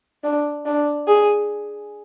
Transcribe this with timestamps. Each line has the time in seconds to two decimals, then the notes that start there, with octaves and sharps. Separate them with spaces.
0.24 D4
0.66 D4
1.07 G#4